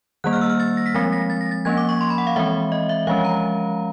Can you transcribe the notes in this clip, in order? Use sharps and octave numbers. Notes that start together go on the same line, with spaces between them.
D#3 G3 A#3 F#6
F6
E6
F6
A6
A#6
B6
F3 G#3 C4 A#6
A#6
A6
A#6
A6
F3 A#3 C#4 G#6
D6
C#6
C6
B5
F#5
F5
E3 G#3 C4 E5
D#5
E5
F3 G#3 C#4 F5
A#5